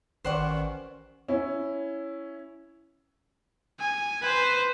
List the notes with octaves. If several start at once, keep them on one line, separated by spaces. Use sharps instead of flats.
A1 D#3 C#4 B4 C5 D5 F#5 C#6
C#4 E4
G#5
B4 C5